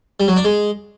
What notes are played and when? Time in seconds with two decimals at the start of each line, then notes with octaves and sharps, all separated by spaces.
0.20 G3
0.28 F#3
0.36 D4
0.45 G#3